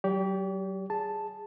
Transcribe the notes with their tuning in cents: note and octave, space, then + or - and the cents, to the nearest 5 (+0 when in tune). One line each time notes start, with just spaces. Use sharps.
F#3 +35 G4 +0 D5 -45
G#4 -10 A5 +0